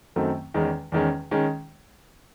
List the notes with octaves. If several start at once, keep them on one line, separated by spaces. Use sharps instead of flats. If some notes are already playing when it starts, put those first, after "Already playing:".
F#2 D#3 F#3 A3 C4
E2 D#3 G#3 C#4
E2 D#3 G#3 C#4
D#3 G#3 C#4